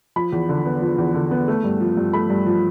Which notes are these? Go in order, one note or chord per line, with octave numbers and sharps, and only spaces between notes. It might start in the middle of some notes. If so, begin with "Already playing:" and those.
F3 B5
E2
D3
B3
F3
E2
D3
B3
A3
G2
F3
G2
A3 B5
G2
F3